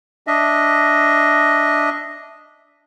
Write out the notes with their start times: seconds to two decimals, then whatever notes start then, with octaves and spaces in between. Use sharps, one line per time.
0.27 D4 D#5 E5